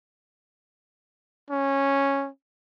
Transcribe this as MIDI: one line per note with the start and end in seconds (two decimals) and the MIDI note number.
1.50 2.29 61